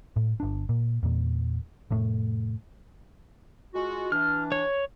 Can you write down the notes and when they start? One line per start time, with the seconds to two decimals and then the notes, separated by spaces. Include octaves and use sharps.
0.16 A2
0.40 G1 D4
0.69 A#2
1.03 E2 A#2
1.91 F1 A2 A3
3.74 G#3 F4 F#4
4.12 E3 D4 F6
4.52 C#5